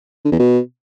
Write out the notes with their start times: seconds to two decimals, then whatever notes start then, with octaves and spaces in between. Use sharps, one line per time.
0.25 D3
0.32 E2
0.39 B2